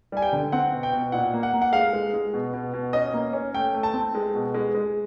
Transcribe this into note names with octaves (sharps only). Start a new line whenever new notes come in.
G3 G#5
G5
D3
C4 F#5
B2
G5
B2
A#2 F#5
A#3
F#5
A#3
F#5
G#3 F5
G#3
G#3
B2
B2
B2
C#4 D#5
A#3
C#4
A3 G5
A3
A5
C4
G#3
B2
G#3
G#3